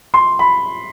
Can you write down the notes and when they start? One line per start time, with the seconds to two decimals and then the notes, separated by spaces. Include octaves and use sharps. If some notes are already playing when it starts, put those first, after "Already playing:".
0.14 C6
0.39 B5